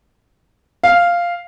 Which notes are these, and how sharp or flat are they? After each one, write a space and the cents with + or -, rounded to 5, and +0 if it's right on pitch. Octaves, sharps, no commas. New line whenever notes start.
F5 -5